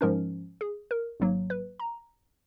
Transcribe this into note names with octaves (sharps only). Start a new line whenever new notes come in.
G#2 F3 G#3 C#4 A#4
G#4
A#4
G#1 G#2 F#3 A#3
B4
A#5